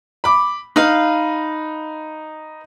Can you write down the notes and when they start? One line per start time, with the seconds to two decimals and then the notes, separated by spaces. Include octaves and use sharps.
0.24 B5 D6
0.76 D#4 B4 F5